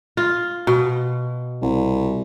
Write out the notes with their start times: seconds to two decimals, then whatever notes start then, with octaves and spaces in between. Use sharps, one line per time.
0.17 F4
0.67 B2
1.62 C2